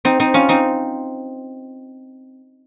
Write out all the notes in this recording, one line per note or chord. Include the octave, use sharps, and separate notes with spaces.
C4 D#4
C4 D#4
C#4 F4
C4 D#4